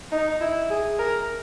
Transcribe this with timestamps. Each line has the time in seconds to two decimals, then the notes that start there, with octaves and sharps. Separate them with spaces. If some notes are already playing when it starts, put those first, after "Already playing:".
0.12 D#4
0.41 E4
0.70 G#4
0.99 A#4